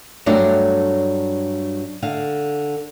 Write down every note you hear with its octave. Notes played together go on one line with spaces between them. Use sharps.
G2 F#3 A3 D4 D5
D3 F5